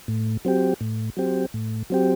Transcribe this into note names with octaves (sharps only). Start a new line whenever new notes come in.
A2
F#3 C4 G4
A2
F#3 C4 G4
A2
F#3 C4 G4